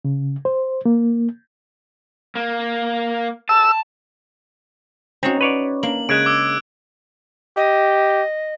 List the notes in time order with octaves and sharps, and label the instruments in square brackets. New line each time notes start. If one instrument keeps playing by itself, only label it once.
[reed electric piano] C#3
C5
A#3
[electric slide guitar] A#3
[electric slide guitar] A5 [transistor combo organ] E6
[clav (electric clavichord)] C4 [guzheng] C#4 D#4 F#4
[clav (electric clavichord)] B4 C#5 D5
[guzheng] A#3 D4 [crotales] F#7
[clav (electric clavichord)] C#3 G#3 [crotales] F#6 G#6 D7
[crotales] D6 E6
[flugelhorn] G4 [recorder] D#5